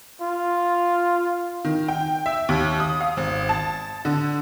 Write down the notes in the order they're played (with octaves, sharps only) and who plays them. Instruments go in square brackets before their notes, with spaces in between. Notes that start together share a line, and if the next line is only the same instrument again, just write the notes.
[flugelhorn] F4
[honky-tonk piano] D#3
G5
E5
D#2
D#6
F5
G#1
A5
D3